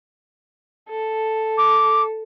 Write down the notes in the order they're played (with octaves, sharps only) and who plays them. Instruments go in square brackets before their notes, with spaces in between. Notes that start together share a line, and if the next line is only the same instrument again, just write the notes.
[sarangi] A4
[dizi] D6